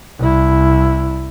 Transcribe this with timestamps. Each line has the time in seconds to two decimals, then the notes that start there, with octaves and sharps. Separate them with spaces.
0.19 C2 E4